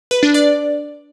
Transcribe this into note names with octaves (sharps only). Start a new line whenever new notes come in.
B4
D4
D5